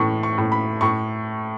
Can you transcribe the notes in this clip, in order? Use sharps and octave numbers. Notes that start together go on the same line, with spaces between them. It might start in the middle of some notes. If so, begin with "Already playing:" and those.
Already playing: A2 E3 C#6
C#6
A2
B5
A2 C#6